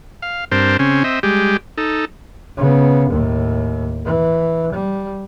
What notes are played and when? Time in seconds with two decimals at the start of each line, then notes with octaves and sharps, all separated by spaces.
0.22 F5
0.52 G2 C4 D4 A#4 C5
0.79 C#3 C4 C#4
1.04 C4 D#5 E5
1.23 G3 G#3 G4
1.78 D#4 A4
2.58 C#3 B3
3.10 D#2 A2
4.05 E3
4.72 G3